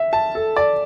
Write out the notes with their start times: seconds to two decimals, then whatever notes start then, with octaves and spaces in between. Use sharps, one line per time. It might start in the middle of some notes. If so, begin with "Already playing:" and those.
Already playing: E5
0.13 A5
0.35 A4
0.56 D5